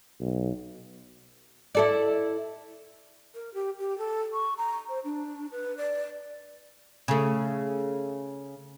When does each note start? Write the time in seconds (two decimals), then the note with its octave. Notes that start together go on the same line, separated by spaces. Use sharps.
0.20 B1
1.75 E4 A4 D5
3.35 A#4
3.54 G4
3.79 G4
3.98 A4
4.33 C#6
4.58 A#5
4.89 C5
5.04 D4
5.52 B4
5.77 D5
7.08 C#3 A3